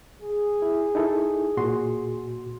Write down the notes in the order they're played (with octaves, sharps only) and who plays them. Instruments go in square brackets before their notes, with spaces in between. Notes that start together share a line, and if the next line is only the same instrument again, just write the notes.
[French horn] G#4
[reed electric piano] E4
D#4 E4 A4
A#2 F#4 C6